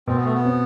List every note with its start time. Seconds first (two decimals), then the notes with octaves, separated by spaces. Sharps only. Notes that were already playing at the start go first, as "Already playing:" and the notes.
0.07 B2 C4
0.16 B3
0.25 A3
0.34 B3
0.45 C4